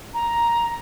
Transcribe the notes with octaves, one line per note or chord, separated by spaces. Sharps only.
A#5